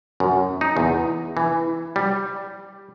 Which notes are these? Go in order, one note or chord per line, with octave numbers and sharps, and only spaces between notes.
F#2
D#4
E2
E3
G3